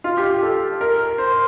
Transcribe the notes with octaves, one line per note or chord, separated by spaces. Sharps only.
F4
G4
G4
A4
A#4
C5
C5